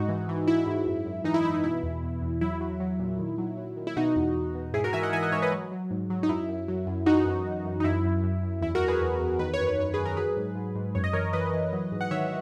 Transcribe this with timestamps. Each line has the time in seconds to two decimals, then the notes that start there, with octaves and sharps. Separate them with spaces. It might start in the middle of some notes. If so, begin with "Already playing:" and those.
Already playing: G#2 D#4 F#4
0.09 E3
0.29 E3
0.47 E3 E4
0.67 G#2
0.87 F#2
1.06 F#2
1.24 E3 D#4
1.34 E4
1.44 E3 E4
1.54 D#4
1.64 B2 E4
1.83 E2
2.03 E2
2.22 E2
2.41 F#3 E4
2.61 F#3
2.80 F#3
2.99 A#2
3.19 D#3
3.38 F#3
3.57 F#3
3.77 D#3
3.87 E4
3.97 B2 D#4 F#4
4.16 E2
4.35 E2
4.55 B2
4.73 G#2 E4 G#4
4.84 F#4 A#4
4.93 E3 E5 G#5
5.03 D#5 F#5
5.13 E3 E5 G#5
5.23 D#5 F#5
5.32 G#2 C#5 E5
5.42 B4 D#5
5.52 F#3
5.72 F#3
5.91 G#2
6.10 F#3
6.23 D#4
6.29 F#2 E4
6.48 F#2
6.68 F#3
6.87 F#2
7.06 E3 D#4 F#4
7.26 F#2
7.46 F#2
7.65 F#2
7.80 D#4
7.84 F#2 E4
8.04 F#2
8.23 F#2
8.43 F#2
8.61 E2 E4
8.75 F#4 A#4
8.81 E2
8.88 G#4 B4
9.01 E2
9.20 E2
9.39 D#3 B4
9.54 C#5
9.59 F#2
9.67 B4
9.78 F#2 C#5
9.94 F#2 G#4 B4
10.06 A#4
10.17 F#3 G#4 B4
10.37 G#2
10.55 G#2
10.75 G#2
10.95 F#2 C#5
11.04 D#5
11.13 E3 A#4 C#5
11.33 E3 B4 D#5
11.53 E3
11.73 F#3
11.92 G#2
12.01 F#5
12.11 D#3 C#5 E5